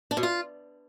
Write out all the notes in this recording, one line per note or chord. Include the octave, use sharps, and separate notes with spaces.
D4
B2
F4